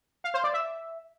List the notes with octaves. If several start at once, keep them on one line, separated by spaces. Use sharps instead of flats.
F5
C5
D5
E5